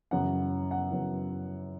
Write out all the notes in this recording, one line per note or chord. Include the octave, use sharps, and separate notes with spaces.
F#2 C#3 E3 F#5
F#5
F#2 C#3 E3